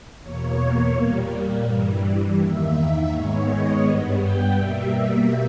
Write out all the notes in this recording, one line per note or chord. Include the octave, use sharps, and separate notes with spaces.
E2 B2 A#3 C#5
A#2 G3 A#3
G2 E3 G3
E2 D#3 A#3 E5
E5
G#2 D#3 G#3 B3 C#5
D#5
G2 G3 B3
G5
B2 G3 A#3 E5